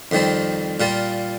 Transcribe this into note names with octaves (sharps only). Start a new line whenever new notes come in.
F2 D#3 G3 C4
A#2 G3 A#3 F4